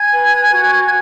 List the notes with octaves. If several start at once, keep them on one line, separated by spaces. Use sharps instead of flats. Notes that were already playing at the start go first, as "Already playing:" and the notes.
Already playing: G#5 G#6
B4
F#4